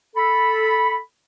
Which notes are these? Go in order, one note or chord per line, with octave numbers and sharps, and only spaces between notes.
A4 B5